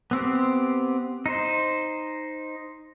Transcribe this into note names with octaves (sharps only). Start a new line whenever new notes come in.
B3 C4 G4
D#4 C5